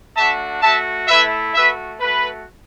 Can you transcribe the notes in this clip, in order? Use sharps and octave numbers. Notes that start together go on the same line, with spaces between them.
A3 D4 F#4 E5 A5
A3 F#4 E5 A5
A3 E4 B4 E5
A3 F#4 B4 E5
A3 F#4 B4